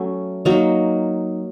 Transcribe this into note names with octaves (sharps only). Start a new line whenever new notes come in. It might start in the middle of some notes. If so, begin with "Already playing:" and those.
Already playing: F#3 A3 C#4
F#3 A#3 D#4